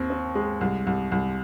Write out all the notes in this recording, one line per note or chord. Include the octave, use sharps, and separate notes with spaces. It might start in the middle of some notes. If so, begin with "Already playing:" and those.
Already playing: D#2 C4
C4
G#3
C2
C2
C2